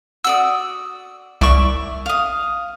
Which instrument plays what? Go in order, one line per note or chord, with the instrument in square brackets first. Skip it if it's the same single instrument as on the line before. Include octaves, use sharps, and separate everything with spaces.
[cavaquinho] F#4 D5 D#6 [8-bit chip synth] E6
[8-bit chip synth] C2 C#6 [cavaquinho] D5 E5 D6
[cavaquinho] F5 D#6